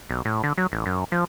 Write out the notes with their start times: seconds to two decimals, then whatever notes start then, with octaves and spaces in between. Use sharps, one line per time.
0.09 B1
0.25 A2
0.43 D3
0.58 F#3
0.72 A1
0.86 F#2
1.12 F3